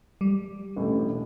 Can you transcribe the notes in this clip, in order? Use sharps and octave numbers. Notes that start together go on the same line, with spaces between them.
G3
E1 A1 A2